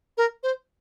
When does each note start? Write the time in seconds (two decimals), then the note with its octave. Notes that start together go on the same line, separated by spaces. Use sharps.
0.17 A#4
0.43 C5